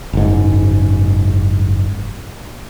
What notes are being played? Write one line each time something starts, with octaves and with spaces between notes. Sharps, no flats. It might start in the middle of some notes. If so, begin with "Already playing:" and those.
F#1 G#2